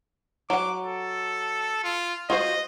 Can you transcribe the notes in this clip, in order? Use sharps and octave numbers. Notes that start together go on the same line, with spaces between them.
F#3 F#5 D6
A4
F4
F4 F#4 C5 D#5